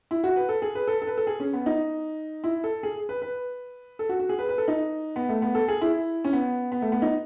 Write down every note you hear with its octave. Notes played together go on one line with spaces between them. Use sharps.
E4
F#4
B4
A4
G#4
B4
A4
A4
B4
A4
G#4
C#4
B3
D#4
E4
A4
G#4
B4
B4
A4
F#4
F#4
G#4
B4
B4
A4
D#4
B3
A3
B3
A4
G#4
E4
C#4
B3
B3
A3
B3
D#4